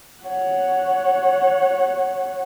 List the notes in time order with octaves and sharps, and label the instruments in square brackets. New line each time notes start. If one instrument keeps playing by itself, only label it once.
[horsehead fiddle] C#5 F#5